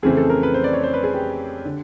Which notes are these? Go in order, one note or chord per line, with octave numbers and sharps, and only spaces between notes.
F2 C#3 E3 A3 C4 G#4
A4
A#4
B4
C5
D5
C#5
C5
B4
G#4
G4
D3